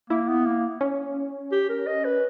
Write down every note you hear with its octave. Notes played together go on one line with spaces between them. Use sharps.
A#3 E4
B3
A#3
C#4
G4
A#4
D#5
B4